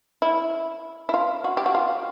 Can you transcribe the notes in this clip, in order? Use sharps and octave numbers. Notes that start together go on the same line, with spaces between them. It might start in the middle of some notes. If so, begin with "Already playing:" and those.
E4
E4
F4
F#4
G4
F#4
F4